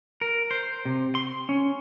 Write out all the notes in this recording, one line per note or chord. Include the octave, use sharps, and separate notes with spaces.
A#4
C5
C3
C6
C#4